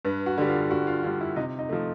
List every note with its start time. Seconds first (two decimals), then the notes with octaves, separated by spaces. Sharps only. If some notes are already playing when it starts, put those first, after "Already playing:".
0.05 G2 B4
0.26 F#4
0.38 D3 G3
0.48 F4
0.70 G2 F#4
0.87 F4
1.03 D3 G3 F4
1.21 E4
1.36 C3 D#4
1.59 D#4
1.69 F3 A3